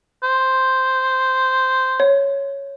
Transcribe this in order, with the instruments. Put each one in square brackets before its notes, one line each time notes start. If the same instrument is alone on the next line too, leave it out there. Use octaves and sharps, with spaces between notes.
[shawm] C5
[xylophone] C#5